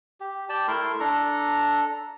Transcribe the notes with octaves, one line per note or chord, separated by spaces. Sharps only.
G4
G4 D5 G5 A5
A3 E4 A#4 C6
D4 A4 A#5